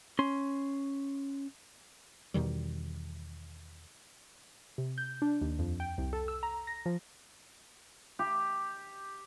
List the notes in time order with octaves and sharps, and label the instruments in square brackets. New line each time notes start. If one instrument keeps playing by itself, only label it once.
[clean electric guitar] C#4 C6
[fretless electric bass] E2 B2 D#3 G3
[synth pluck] C3
G6
D4
D#2
F2
G5
C2
A4
E6
A#5
A#6
F3
[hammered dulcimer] G4